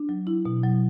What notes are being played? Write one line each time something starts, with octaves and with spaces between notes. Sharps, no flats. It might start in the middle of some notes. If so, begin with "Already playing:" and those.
Already playing: D4
F#3
E4
B2
F#3